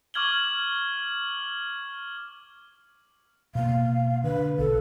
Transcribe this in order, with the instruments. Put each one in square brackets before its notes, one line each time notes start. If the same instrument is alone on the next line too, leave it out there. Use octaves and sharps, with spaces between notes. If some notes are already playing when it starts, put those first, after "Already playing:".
[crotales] C#6 D6 F6 G#6 F#7 G7
[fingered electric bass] B2 A#3 [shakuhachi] F5
[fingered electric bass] D3 [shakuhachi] B4
[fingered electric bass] B1 [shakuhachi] A4